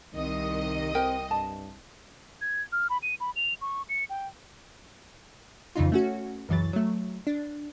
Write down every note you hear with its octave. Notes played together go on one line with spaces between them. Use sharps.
C2 D#3 D#5
C4 A#4 G5
G2 A5
G#6
F6
B5
D#7
B5
F7
C#6
C#7
G5
F2 C#3 E3 D#4 F4
A3 C#4 F#4
C#2 F#2 E3 F#3 A6
F#3 A3
D4